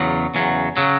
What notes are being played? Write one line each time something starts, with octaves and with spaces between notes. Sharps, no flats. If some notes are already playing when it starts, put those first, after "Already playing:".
Already playing: E2 C#3 F#3
E2 C#3 F#3
C#3 F#3